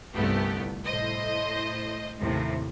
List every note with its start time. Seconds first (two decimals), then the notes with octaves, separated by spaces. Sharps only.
0.14 G1 C2 A3 B3 G4
0.85 A2 C5 D#5
2.20 D#2 A2 C3